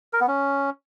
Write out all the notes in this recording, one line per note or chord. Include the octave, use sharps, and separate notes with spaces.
A#4
B3
C#4